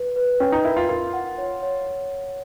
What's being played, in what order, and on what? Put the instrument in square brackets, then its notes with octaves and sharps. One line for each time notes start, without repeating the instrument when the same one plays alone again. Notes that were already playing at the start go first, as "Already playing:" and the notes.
Already playing: [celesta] B4
B4
[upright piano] C#4 [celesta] G5
[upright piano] D#4
[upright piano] E4 [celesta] A#4
[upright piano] F4
[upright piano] F4 [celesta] A#4
[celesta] F#5
C#5
C#5